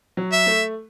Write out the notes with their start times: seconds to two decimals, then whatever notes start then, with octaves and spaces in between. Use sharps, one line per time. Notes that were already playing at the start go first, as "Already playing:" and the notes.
0.17 F#3
0.32 E5
0.47 A3